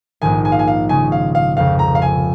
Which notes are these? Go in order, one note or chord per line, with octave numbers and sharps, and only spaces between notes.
A#1 G#2 D#3 G#5
G#5
F5
G#5
F5
C#3 G#3 C#4 G#5
F5
F5
F1 F2 C#3 F5
A#5
F5
G#5